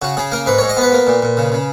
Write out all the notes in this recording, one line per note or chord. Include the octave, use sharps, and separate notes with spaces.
C#3 F#4
C#3 G#4
A#3 A#4
G#2 B4
G#2 C#5
D#5
B3 B4
A#3
A#2
A#2
C#3
C#3